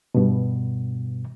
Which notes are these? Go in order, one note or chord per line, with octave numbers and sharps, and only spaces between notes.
G2 B2